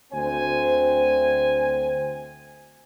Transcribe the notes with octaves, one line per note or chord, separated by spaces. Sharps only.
D2 C4 C5 G#5